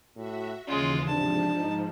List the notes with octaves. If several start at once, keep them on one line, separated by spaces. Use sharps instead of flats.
A2 F#4 E5
D#2 C#3 E3 G#3 C#4 F4
G#2 C3 F3 D4 A5
D#4